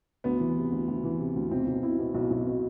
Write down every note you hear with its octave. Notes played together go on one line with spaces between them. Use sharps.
D2 B3
E3
C3
D2
D2
E3
C3
D2
B1 C4
B1
B2 E4
B2
B1
B1
B2